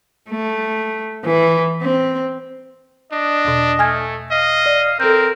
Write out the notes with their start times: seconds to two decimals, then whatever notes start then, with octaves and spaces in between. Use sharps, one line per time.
0.30 A3
1.25 E3
1.82 C4
3.12 D4 D#5
3.45 E2 B2
3.79 A3 G#5 F6 G#6
4.31 D#5 F5
4.66 D5
5.00 C4 A4 A#4 G6